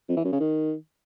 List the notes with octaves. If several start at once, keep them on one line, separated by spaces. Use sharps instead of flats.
F2
E3
F#2
C#3
D#3